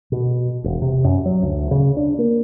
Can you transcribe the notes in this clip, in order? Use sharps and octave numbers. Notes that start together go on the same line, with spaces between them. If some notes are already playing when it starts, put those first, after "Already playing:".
B2
E1
C3
F#2
F#3
D2
C#3
D4
A#3